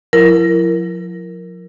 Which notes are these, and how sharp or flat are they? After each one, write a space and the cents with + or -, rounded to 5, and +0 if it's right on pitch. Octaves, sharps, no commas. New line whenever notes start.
F3 +40 E4 +25 A#4 +0